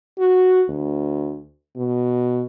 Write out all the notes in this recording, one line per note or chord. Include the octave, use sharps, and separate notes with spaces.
F#4
D2
B2